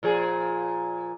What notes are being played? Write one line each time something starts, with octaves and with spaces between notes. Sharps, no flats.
A#2 F3 G#4